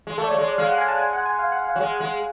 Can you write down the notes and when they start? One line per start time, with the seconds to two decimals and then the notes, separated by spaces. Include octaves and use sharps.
0.07 G#3
0.18 A3 A4
0.24 D5
0.27 C#5
0.31 A3
0.38 G#3 C#5
0.48 D5
0.58 G#3 F5
0.68 F#5
0.78 G#5
0.88 A5
0.99 G#5
1.13 F#5
1.26 G#5
1.39 F5
1.52 F#5
1.65 F5
1.76 F#3
1.80 G#3
2.00 G#3